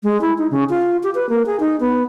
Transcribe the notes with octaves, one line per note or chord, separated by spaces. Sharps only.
G#3
E4
D#4
C#3
F4
G4
B4
A#3
G#4
D#4
B3